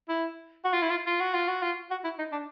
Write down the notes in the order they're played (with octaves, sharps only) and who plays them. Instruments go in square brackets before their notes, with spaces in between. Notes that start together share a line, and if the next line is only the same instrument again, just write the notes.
[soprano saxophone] E4
F#4
F4
E4
F4
F4
F#4
F4
F#4
F4
F#4
E4
D#4
D4